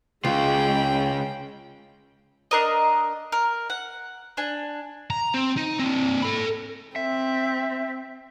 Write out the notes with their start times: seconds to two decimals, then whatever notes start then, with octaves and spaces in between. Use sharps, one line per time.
0.25 C#2 C#3 G#3 F4 G5
2.51 D4 A#4 D#5
3.32 A#4
3.70 F#5
4.37 D4 G#5
5.10 A#5
5.34 C4
5.57 D#4
5.80 C4 D4
6.23 A4 B5
6.96 C4 E5